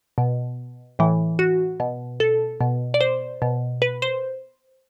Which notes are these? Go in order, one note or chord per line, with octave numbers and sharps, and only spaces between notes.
B2
A2 E3
F#4
B2
A4
B2
D5
C5
B2
B4
C5